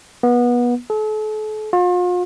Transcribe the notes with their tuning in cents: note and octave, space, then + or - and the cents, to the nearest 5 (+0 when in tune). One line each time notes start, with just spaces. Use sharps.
B3 -25
A4 -40
F4 +40